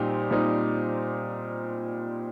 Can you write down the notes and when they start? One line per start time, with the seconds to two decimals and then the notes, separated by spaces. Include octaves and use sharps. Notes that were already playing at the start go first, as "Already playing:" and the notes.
Already playing: A#2 G3 C4 D#4 G4
0.31 A#2 G3 C4 D#4